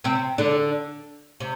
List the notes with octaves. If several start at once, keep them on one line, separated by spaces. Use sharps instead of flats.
C3 C4
D3 D4
C3